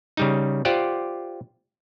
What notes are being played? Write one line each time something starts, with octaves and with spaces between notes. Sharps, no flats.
C#3 G3 D#4
F4 G4 C5 D5 F#5